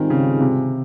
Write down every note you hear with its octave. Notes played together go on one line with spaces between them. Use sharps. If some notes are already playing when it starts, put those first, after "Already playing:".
Already playing: G#2 D#3 G3 C4 F4 G#4
C#3
C3